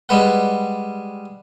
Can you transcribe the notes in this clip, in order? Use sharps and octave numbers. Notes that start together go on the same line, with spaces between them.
G3 G#3 B4 F#5